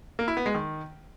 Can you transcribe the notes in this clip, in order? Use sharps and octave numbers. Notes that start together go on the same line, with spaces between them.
A#3
E4
B3
G#3
D#3